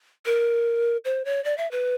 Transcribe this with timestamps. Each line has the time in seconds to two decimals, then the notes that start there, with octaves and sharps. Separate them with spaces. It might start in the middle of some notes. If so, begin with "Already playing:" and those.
0.26 A#4
1.05 C5
1.25 C#5
1.45 D5
1.58 E5
1.71 B4